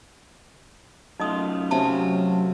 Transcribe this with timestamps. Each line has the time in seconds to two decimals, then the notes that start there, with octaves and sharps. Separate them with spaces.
1.20 F#2 A3 D#4 F4 D#5 D#6
1.71 C3 F#3 C#4 A5